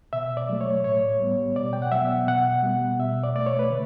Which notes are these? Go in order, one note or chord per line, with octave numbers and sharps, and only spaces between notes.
B2 E5
D5
F#3 A3
C#5
A2 C#5
G3 B3
B2 D5
G5
F#5
F#3 B3 E5
B2 F#5
G3 B3
B2 E5
D5
A3 D5
C#5
B4
D3